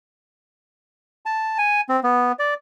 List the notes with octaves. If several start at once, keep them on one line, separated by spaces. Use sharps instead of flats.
A5
G#5
C4
B3
D5